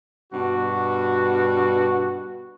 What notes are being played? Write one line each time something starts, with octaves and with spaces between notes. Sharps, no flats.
G2 B2 F#4